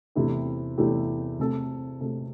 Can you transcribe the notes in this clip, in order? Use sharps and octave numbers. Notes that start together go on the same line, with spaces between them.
E2 C3 A3 E4 G4
E2 C3 A3 E4 G4
C3 A3 C4 A4
C3 A3 C4 A4